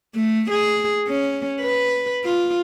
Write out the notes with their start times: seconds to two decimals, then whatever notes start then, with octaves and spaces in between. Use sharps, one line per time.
0.15 A3
0.50 G#4
1.07 C#4
1.61 B4
2.24 F4